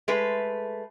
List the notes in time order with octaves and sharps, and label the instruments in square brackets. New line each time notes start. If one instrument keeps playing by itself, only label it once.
[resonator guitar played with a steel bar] G#3 A3 B4